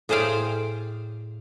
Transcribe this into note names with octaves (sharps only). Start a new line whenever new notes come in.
A2 G#4 C5 D5 F5 G5